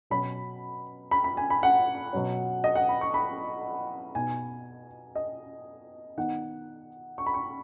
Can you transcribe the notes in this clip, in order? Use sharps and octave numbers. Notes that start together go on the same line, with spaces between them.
B2 F#3 C#4 B5
B5
B5
G#5
B5
F#5
B2 F#3 C#4
D#5
F#5
B5
C#6
B5
B2 B3 D#4 G#5
D#5
D#3 B3 D#4 F#5
C#6
B5
C#6